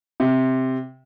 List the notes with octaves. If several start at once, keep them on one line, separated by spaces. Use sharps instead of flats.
C3